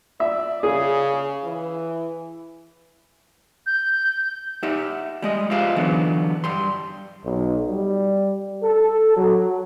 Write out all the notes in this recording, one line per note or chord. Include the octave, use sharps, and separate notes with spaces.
D5 E5
C#3 G#4
E3
G6
D#4 G4 E5 F#5
G3 G#3 D#5
F4 G4 G#4 C5 E5 F5
D3 E3 F#3 B3
G2 G3 C6
B1
G3
A4
F#3